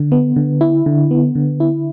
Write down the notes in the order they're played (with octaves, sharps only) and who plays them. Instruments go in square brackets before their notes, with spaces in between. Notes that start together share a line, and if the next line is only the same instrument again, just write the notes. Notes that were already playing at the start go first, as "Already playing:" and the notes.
Already playing: [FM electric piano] D3
B3
D3
E4
D3
B3
D3
E4